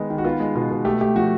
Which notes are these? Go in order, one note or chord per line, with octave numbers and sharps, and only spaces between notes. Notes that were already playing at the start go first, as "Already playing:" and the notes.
Already playing: D#3 G#3 B3 D#4
D#3
F#4
B3 F4
G#3
B2 F4
B2
A3 G4
A3 G4
F3 F#4